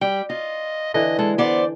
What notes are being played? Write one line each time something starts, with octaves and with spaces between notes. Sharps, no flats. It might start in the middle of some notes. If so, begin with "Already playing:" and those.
G3 G5
F4 D#5
D3 E3 D#5
G#3 A4
B3 C5 D5